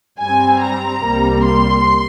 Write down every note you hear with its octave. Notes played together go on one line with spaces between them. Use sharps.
G2 G3 C4 G#5
A#5
C2 C3 G3 A#3
C6